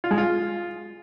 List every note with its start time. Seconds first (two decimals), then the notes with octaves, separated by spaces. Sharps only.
0.04 F4
0.11 G#3
0.18 F4